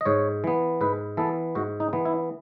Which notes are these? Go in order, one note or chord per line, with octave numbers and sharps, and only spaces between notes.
D#5
G#2 C#5
E3 B3
G#2 B4
E3 B3 A4
G#2 F#4
D#4
E3 B3
E4